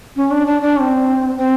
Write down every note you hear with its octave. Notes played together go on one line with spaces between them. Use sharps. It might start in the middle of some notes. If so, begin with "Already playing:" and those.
C#4
D4
D4
D4
C#4
C4
C4